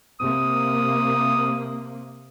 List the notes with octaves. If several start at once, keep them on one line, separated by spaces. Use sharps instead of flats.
C3 A#3 D#6